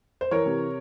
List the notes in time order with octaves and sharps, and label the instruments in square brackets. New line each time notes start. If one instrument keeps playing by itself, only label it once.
[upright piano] C5
E3 A#4 C#5
C3